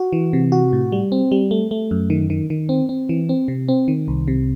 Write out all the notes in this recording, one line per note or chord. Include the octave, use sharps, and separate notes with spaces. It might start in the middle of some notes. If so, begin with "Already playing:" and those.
Already playing: F#4
E3
C3
F#4
A2
G3
C4
G3
A3
A3
F#2
D#3
D#3
D#3
C4
C4
E3
C4
C3
C4
D#3
C2
C3